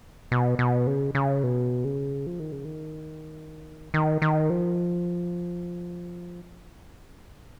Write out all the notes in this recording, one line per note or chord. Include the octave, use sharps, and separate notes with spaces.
B2
B2
C#3
C#3
B2
C#3
F3
D#3
C#3
D#3
D#3
D#3
F3